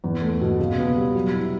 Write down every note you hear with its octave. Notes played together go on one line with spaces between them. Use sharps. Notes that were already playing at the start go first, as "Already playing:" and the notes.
E2
A3
B2
C#3
B3
G3
F#3
E4